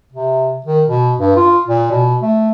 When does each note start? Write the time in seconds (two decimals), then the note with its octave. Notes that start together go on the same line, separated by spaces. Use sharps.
0.12 C3
0.66 D#3
0.87 B2
1.19 G2
1.36 F4
1.68 A#2
1.91 B2
2.22 A3